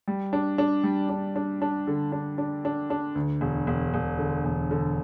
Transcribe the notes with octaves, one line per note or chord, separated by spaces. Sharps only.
G3
D4
D4
G3
D4
D4
D4
D3
D4
D4
D4
D4
D2
E1
E1
E1
D3
E1
D3